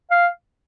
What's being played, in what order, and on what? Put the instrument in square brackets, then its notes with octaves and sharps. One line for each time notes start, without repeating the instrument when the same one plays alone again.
[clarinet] F5